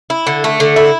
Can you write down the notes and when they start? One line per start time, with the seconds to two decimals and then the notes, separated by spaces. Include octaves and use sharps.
0.10 E4
0.27 D3
0.44 A3
0.60 D3
0.76 E4